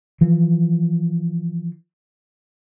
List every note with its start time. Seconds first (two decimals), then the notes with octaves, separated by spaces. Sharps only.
0.21 E3 F3